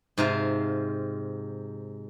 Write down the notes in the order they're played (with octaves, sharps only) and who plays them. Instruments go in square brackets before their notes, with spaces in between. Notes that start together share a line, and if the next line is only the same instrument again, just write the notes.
[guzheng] G#2 C3 F4 F5